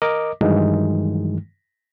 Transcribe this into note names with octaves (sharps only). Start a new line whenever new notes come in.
A#4 D#5 D6
G2 D#3 E3 F#3 G#3 D#4